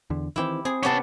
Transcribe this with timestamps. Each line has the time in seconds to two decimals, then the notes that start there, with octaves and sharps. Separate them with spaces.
0.10 E2 D3
0.36 D#3 E3 C4 E4 G4
0.65 C4 G#4
0.83 C3 B3 C#4 G4 A5